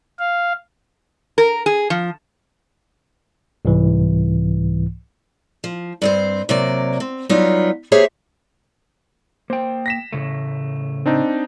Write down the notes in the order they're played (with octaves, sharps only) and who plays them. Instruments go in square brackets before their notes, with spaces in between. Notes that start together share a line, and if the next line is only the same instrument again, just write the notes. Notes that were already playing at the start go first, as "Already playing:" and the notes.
[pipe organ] F5
[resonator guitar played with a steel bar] A#4
G#4
F3
[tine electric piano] C2 G#2 E3
[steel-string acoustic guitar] F3
G2 C4 C5
C3 F#3 A#3 D5
C4
F#3 G3 B3 D#4 F4
A#3 G4 G#4 C5 C#5 E5
[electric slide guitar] A#3 G5 [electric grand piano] C5
[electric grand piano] A#6 B6 E7
[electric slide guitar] A2 C#3 A3
[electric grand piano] C4 D4 D#4